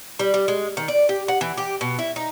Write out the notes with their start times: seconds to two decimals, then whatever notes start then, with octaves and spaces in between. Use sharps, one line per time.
0.19 G3
0.34 G3
0.48 G#3
0.77 D#3
0.88 D5
1.09 G4
1.28 F#5
1.41 E3
1.57 G4
1.81 B2
1.99 E4
2.16 D#4